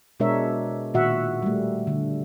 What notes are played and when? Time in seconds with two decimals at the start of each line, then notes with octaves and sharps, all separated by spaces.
0.20 B2 G#3 D4 A#4 C#5 E5
0.94 A#2 D#3 F#4 E5 F#5
1.42 G3 A3
1.87 D3